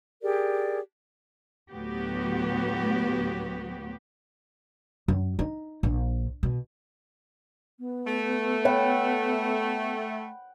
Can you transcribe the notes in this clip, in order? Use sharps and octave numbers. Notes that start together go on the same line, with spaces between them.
G4 G#4 A#4 D5
D2 A2 F#3 B3 F#4 G4
F#2
D#4
A#1
B2
B3
A3
F#5 G5 B5